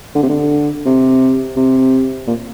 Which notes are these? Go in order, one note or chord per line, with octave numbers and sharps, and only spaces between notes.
D3
C3
D3
C3
C3
A#2